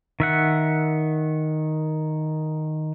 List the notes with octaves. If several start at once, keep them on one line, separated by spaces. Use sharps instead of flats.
D#3 E5 F#5